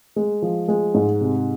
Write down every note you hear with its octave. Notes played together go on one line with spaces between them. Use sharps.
G#3
F3
G#3
G#2
C3